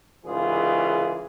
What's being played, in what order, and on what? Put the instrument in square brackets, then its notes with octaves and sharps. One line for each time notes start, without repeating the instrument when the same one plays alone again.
[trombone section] C2 G#2 C#3 E3 F4 G#4